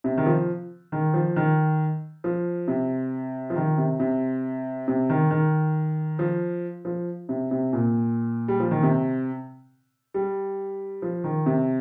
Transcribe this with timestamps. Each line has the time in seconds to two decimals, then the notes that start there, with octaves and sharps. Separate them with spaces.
0.04 C3
0.18 D#3
0.26 F3
0.92 D#3
1.14 F3
1.36 D#3
2.24 F3
2.68 C3
3.50 F3
3.56 D#3
3.78 C3
4.00 C3
4.88 C3
5.10 D#3
5.31 D#3
6.19 F3
6.85 F3
7.29 C3
7.51 C3
7.73 A#2
8.48 G3
8.60 F3
8.71 D#3
8.83 C3
10.14 G3
11.02 F3
11.24 D#3
11.46 C3